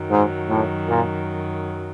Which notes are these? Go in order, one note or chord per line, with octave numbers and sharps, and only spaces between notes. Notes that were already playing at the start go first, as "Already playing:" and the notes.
Already playing: F#2 D#3 F#3
G#2
A2
A#2